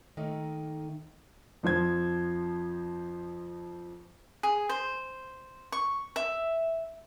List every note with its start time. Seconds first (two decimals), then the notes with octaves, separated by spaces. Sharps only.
0.17 D#3 A3 A#3 D#4
1.63 F2 F3 C5 G#6
4.43 G#4
4.69 C5
5.72 C#6
6.16 E5